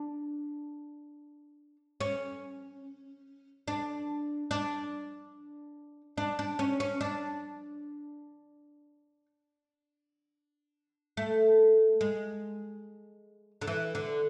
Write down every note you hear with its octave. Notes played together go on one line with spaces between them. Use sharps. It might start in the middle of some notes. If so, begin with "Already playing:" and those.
Already playing: D4
C#4
D4
D4
D4
D4
C#4
C#4
D4
A3
G#3
D3
E3
D3